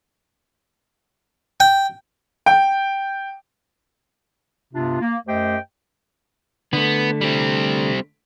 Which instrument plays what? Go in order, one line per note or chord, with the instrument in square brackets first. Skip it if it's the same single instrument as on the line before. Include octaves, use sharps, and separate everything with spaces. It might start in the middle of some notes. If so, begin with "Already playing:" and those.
[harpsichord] G5
[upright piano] G5
[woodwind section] G2 C3 B3 D4 F4
A#3
F#2 A3 G4 C5 D#5 G5
[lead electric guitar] D3 A3 [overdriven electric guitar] B3
[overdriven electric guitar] G3 C4